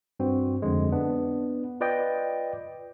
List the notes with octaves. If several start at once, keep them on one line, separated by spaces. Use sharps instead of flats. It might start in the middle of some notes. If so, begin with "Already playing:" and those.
G2 C4 F#4
F2 D3 G#3
B3 D4
F4 B4 D5 D#5 G5